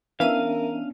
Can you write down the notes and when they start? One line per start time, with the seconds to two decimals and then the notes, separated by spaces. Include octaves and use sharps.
0.20 E3 B3 C#4 D4 A#4 E5 F5 D#7